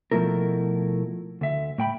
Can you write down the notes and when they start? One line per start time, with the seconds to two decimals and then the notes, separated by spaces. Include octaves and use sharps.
0.12 B2 F3 A3 E4 A#4
1.41 D2 E5
1.78 A2 G5 B5